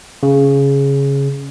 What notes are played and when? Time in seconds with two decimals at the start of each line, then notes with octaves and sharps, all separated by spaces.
0.23 C#3